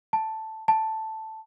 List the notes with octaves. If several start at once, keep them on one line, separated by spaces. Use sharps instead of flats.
A5
A5